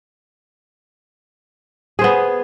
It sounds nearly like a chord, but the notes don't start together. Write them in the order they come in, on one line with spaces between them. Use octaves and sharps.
G#4 C5 B3